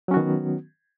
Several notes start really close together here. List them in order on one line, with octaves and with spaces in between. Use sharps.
F#3 C#4 F#4 D#3 B3